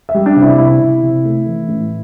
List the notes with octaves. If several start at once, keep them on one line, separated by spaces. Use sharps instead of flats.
E5
G3
D4
C3
E4
C3 E4
C3
C3
A3
E3
A2